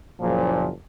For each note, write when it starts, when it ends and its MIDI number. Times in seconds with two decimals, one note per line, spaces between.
0.20 0.68 30
0.20 0.68 46
0.20 0.68 53